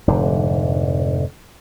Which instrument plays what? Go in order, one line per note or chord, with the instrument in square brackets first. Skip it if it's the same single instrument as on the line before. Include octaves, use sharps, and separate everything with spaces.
[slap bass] F1 G#2 D3